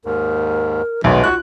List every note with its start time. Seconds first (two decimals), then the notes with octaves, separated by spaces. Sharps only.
0.05 D#2 G#2 A#4
1.04 B1 B2 D#3 G#3 A3 B3
1.24 F4 F#4 F#6